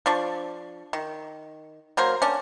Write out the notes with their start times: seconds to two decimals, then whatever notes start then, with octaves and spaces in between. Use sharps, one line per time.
0.06 F3 D4 C#6
0.93 D#3
1.97 F#3 A#3 A#4 C5
2.22 C#4 D4